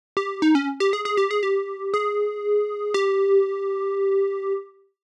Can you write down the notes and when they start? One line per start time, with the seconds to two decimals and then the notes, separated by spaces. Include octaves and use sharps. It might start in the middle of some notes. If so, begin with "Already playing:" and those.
0.17 G4
0.42 D#4
0.55 C#4
0.80 G4
0.93 G#4
1.05 G#4
1.17 G4
1.31 G#4
1.43 G4
1.94 G#4
2.94 G4